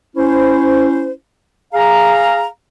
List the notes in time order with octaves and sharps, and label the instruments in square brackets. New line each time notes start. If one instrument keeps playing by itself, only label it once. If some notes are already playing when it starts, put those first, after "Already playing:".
[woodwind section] C#4 E4 C5
G#4 F5 A#5